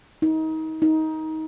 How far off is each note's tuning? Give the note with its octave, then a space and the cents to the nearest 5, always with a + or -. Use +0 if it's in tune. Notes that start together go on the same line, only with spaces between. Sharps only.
D#4 +30
D#4 +20